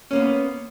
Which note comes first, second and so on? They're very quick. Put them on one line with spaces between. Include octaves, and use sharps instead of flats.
C#4 A#3 B3